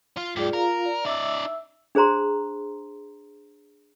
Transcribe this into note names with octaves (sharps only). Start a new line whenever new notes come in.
F4
G#2 F4 G4 G#4 D5
F4 A#4 F5 A#5
D5
D#4 D5 E5 E6
D4 G#4 C5 A#5 C6